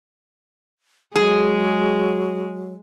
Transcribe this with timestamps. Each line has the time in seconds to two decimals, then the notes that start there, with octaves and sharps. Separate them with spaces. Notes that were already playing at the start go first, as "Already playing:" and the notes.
1.16 F#3 G#3 G#4